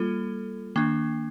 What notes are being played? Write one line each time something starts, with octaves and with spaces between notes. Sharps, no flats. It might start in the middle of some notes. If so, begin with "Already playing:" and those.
Already playing: G3 A#3 F4 A4
D#3 A#3 D4